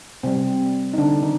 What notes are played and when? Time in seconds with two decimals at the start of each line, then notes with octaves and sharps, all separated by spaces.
0.23 C3 G3 C4
0.93 D#4
0.98 D3 D4
1.23 D#3 D#4